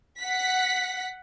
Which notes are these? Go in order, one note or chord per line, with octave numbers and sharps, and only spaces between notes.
F#5 B6